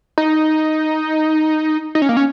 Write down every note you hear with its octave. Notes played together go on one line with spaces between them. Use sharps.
D#4
D#4
C#4
A#3
C#4